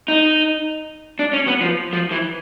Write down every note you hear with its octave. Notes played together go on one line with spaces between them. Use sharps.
D#4
D4
C#4
B3
F3
F3
E3